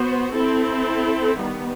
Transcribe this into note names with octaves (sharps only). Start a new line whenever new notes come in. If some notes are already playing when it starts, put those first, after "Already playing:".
Already playing: B3 F#4 C5
C4 E4 A4
D#3 G3 B3